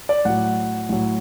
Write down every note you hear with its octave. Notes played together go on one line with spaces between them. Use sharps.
D5
A2 F#3 F#5
A2 F#3